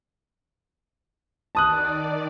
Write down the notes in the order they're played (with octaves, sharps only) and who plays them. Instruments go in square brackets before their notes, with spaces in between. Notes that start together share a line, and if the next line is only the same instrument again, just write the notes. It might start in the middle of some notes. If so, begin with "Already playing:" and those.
[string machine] D#3 D5 [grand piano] A5 D#6 F#6